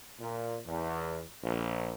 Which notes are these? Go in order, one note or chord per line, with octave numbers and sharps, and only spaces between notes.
A#2
E2
A#1